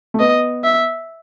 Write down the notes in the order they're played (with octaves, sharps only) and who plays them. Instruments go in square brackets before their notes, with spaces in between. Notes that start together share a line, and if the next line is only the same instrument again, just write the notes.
[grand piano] A3
[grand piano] B3 [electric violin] D#5
[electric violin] E5